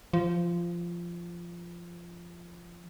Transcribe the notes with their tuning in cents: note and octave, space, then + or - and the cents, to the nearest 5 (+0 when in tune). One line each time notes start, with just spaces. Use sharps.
F3 -15